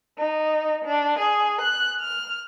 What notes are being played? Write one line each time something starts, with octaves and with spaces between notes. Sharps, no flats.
D#4
D4
G#4
F#6
F6